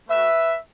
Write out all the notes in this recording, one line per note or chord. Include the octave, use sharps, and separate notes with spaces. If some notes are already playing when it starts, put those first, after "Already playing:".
A3 F#4 B4 E5